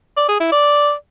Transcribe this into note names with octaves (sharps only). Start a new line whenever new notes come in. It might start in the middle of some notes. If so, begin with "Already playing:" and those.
D5
G#4
E4
D5